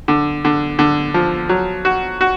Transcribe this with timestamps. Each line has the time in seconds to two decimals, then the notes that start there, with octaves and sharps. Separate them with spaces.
0.08 D3
0.45 D3
0.79 D3
1.14 F3
1.49 F#3
1.85 F#4
2.21 F#4